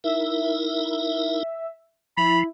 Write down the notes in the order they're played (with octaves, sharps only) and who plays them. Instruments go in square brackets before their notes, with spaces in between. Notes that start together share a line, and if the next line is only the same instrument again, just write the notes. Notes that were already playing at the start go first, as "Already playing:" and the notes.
[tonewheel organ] D#4 E4 A#4 [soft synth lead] E5
[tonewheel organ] F3 [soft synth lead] E4 [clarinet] B5